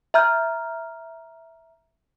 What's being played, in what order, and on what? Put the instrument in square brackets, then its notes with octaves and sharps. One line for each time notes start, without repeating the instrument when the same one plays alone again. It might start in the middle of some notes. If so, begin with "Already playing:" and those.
[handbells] E5 A#5 F6 G6